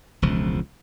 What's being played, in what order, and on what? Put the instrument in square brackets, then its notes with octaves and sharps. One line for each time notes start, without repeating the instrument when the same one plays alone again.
[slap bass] E1 C#2 F3